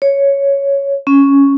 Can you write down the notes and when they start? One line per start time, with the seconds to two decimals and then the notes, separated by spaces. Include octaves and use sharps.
0.02 C#5
1.07 C#4